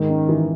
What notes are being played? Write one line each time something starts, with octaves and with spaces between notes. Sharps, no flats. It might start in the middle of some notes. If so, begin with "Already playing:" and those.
Already playing: G#2 D#3
C#4
E3